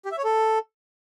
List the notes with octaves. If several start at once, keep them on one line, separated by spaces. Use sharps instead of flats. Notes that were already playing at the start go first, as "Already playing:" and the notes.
G4
E5
C#5
A4